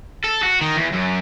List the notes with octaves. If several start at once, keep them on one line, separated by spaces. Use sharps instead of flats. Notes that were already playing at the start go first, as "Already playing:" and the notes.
A4
F#4
D#3
E2
F#2